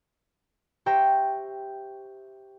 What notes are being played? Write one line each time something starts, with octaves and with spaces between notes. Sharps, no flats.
G4 C5 E5 G5 A#5 C#6